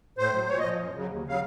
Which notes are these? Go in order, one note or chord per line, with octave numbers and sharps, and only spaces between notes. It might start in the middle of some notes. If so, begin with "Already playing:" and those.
A2 C5
F#3
A#2 C#5
D#5
F3
F#2
C#3 F#3
D#2
C#3 F#3 F5